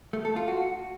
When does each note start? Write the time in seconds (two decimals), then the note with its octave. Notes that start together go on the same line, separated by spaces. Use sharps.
0.13 A3
0.25 A4
0.36 F4
0.48 F#4